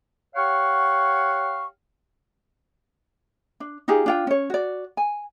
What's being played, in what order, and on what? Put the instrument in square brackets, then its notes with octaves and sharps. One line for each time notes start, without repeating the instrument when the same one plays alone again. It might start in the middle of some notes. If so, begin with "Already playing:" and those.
[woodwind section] G4 C#5 F5 F#5 C#6
[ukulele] D4
D#4 F4 G4 G#4
D4 F4 G5
C#4 C#5
F#4 D5
G#5